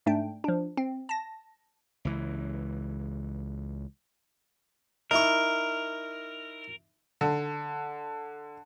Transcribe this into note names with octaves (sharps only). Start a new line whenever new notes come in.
G#2 A3 D4 G5
F3 D4
C4
A5 A#6
C#2 E3
D#4 E4 A#4 C#6
D3